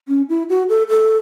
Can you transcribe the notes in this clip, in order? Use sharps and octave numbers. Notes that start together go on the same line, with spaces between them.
C#4
E4
F#4
A4
A4